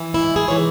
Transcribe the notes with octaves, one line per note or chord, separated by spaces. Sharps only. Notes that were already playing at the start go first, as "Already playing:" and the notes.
Already playing: E3
E4
G#2
G#4
E3 C#5